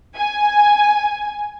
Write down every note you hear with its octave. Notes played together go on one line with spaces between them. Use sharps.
G#5